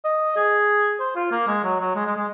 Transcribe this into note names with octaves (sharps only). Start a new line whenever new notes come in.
D#5
G#4
C5
F4
A#3
G#3
F#3
F#3
G#3
G#3
G#3